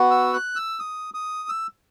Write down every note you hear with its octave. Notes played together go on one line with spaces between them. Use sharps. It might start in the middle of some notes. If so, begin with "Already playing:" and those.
Already playing: B3 F#4
E6
F#6
E6
D#6
D#6
E6